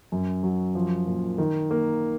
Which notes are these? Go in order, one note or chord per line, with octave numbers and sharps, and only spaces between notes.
F#2
F#3
F3
A#2
D#3
A#3